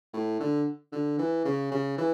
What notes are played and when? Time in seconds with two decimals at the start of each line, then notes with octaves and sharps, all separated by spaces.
0.14 A2
0.40 D3
0.92 D3
1.19 E3
1.45 C#3
1.71 C#3
1.98 E3